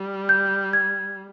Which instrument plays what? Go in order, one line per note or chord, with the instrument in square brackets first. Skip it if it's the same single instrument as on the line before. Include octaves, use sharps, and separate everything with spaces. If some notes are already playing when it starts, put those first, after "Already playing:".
Already playing: [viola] G3
[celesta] G6
G#6